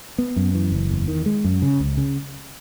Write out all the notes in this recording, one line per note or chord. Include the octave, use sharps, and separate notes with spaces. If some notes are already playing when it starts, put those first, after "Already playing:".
B3
F#2
E3
F#1
E2
D#3
G#3
F#2
C#3
C#2
C#3